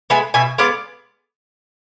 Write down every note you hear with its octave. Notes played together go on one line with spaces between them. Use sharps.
G#3 B3 E5 G#5
B2 E5 G#5
G#3 B3 D5 F5